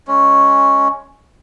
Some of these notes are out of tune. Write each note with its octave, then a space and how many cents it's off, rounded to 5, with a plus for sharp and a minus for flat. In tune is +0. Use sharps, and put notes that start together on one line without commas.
G#3 +0 C#4 +0